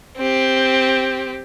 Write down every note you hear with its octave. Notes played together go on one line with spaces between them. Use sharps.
C4 G4